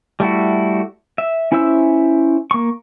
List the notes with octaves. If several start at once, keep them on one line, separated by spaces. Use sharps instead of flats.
G3 A3 E4 F#4
E5
C#4 E4 C5 E5 E6
A#3 C#6